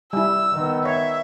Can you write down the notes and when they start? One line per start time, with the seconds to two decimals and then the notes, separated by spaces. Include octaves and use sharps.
0.13 G3 E4 E6
0.53 D#3 B3
0.85 C#5 E5